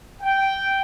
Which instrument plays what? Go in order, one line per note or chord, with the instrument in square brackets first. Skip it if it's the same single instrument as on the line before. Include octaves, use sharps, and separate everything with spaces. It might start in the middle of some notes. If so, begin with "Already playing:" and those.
[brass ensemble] G5